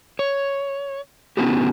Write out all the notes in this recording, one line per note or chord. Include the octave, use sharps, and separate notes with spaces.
C#5
D3 B3 C#4 E4 F#4 G4